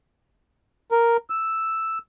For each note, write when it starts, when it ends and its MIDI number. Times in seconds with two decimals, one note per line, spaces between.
0.92 1.17 70
1.30 1.99 88